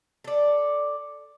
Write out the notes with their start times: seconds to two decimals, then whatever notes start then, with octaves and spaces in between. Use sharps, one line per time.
0.24 A4 D5